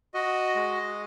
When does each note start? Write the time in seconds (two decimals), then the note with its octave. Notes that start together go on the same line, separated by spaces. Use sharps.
0.14 F#4 D#5
0.55 G#3